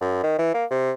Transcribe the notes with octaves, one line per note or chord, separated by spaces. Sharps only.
F#2
D#3
E3
A#3
C3